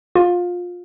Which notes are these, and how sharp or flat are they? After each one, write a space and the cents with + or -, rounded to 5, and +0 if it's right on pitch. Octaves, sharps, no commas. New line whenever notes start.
F4 +20